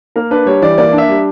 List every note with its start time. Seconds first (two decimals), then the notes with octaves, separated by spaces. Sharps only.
0.16 A#3 A#4
0.31 D4 B4
0.46 G3 C#5
0.62 E3 D5
0.78 A#3 D5
0.93 D4
0.98 E5
1.09 G3